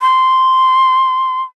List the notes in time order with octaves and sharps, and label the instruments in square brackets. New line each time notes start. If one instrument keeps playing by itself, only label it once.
[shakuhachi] C6